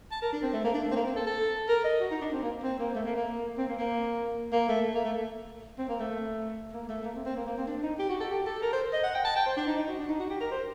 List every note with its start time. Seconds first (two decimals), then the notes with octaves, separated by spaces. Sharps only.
0.12 A5
0.22 A#4
0.33 D4
0.43 C4
0.53 A3
0.64 A#3
0.74 D4
0.85 A3
0.91 C4
0.95 A#3
1.06 C4
1.16 A4
1.27 A4
1.69 A#4
1.84 D#5
2.00 F#4
2.11 D#4
2.21 D4
2.32 C4
2.43 A#3
2.63 C4
2.79 A#3
2.95 A3
3.05 A#3
3.16 A#3
3.58 C4
3.68 A#3
3.79 A#3
4.52 A#3
4.68 A3
4.95 A#3
5.05 A3
5.78 C4
5.89 A#3
6.00 A3
6.73 A#3
6.89 A3
7.04 A#3
7.15 C4
7.25 C4
7.36 A#3
7.47 A#3
7.57 C4
7.68 D4
7.83 D#4
7.99 G4
8.09 F#4
8.20 A4
8.31 G4
8.46 A4
8.62 A#4
8.73 C5
8.93 D#5
9.04 F#5
9.15 G5
9.25 A5
9.36 G5
9.46 C5
9.57 D4
9.67 D#4
9.77 D#4
9.88 F#4
9.99 D4
10.09 D#4
10.20 F#4
10.30 G4
10.40 A#4
10.51 C5